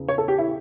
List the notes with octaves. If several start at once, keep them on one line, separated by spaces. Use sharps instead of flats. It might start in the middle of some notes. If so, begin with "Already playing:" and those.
Already playing: E2 C#3
C#5
A4
G4
E4